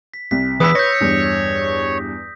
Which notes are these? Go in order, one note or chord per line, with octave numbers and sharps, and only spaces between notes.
B6
C2 B6
E2 B4 D#6 E6 B6
C#5 G6 A#6
E2 G2